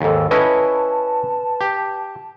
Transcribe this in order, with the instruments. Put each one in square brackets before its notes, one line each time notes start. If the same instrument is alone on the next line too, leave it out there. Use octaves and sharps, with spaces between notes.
[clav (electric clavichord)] D#2 G#2 [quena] A4
[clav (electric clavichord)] C#4 E4 D#5 [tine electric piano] B4 [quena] A5
[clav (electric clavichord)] G4